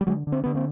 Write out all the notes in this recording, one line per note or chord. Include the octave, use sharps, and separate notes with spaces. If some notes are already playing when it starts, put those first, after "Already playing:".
G3
D3 F#3 G#3
D3
C4
D3 B3
A#3 C4